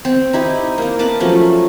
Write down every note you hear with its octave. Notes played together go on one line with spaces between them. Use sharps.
C4 C5
D#4 E4 G4
A#3 D#4
A#4 B4 A5 D6
F3 F#3 A3 C#4